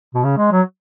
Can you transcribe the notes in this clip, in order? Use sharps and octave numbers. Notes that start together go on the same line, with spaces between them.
B2
C#3
G#3
F#3